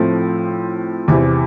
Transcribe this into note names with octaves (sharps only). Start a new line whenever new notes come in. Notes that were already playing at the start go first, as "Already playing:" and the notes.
Already playing: A2 F3 A3 C4
E2 C3 E3